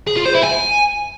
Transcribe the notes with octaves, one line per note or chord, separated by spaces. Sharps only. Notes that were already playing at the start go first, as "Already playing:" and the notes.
G#4
F4
C5
E4
G#5